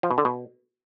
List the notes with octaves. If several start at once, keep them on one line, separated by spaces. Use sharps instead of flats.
F3
B2
D3
B2